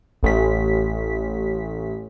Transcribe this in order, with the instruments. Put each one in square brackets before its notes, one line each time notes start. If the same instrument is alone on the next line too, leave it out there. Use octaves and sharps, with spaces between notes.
[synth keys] A1 B6